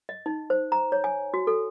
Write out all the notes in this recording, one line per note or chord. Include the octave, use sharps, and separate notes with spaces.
D#5
D#4
C5
A#5
C#5
G#5
F#4
A4